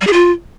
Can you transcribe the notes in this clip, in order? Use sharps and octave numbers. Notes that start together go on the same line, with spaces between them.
G3
G#4
F4